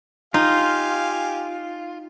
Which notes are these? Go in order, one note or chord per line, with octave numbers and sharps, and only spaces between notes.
D#4 F4 G4 F5 G#5